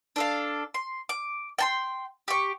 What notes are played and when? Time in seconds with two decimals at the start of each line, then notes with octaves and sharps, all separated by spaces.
0.16 D4 A4 F5
0.74 C6
1.09 D6
1.59 G5 A5 C6
2.28 G4 C#6